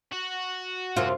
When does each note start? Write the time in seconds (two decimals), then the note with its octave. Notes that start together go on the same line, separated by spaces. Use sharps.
0.13 F#4
0.96 F#2 C3 F4